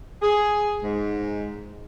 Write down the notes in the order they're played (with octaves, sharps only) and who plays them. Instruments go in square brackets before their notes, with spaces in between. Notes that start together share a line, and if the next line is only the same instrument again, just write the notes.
[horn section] G#4
G#2